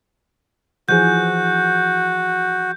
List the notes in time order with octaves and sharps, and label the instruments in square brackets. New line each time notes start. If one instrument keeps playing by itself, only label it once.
[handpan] E3 F3 G#4 [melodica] F#4 [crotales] G6